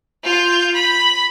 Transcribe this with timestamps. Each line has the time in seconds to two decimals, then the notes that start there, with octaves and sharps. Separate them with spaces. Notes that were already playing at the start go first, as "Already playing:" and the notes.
0.24 F4 G6
0.74 B5